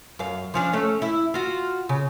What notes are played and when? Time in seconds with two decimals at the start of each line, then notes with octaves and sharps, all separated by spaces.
0.19 F#2 F5
0.54 F3 C#4 D4
0.73 A3 C#4
1.02 E4
1.34 F4 F#4
1.89 C#3